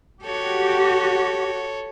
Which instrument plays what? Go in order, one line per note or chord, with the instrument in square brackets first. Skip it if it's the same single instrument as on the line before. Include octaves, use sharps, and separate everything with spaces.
[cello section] F#4 G4 [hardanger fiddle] A4 C#5